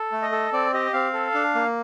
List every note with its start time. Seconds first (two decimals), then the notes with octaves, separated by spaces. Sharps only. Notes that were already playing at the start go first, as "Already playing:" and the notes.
Already playing: A4
0.12 A3
0.22 D#5
0.32 A4
0.53 C4 D5
0.73 G4 D#5
0.93 C4 F5
1.13 A4
1.34 D4
1.55 A#3